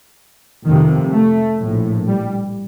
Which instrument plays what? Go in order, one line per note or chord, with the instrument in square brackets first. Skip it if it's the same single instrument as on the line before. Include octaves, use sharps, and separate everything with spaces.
[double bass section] F1 F2 C3 D#3
A3
A#1 A2
G3